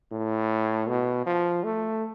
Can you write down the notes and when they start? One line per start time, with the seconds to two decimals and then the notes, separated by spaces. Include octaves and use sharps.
0.12 A2
0.88 B2
1.26 F3
1.64 A3